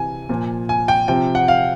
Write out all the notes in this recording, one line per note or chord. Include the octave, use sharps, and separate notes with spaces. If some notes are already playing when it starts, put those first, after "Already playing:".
Already playing: C3 E3 G#5
A#2 F3
G#5
G5
C3 F3 G5
F#5
F5